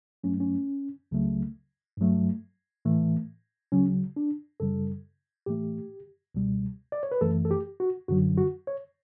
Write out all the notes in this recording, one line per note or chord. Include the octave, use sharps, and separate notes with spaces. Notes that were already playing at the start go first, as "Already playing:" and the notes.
G2 F#3 A3 C#4
C#4
C#2 C#3 F#3 A3
G2 F#3 A3
A2 E3 A3
D2 C#3 F#3 C#4
D4
F#2 C#3 G3 A4
A2 E3 A3 G4
C#2 B2 G3
D5
C#5
B4
F#2 E3 A3 A4
A4
G4
F#4
F#2 D3 F#3 F#4
F#4
C#5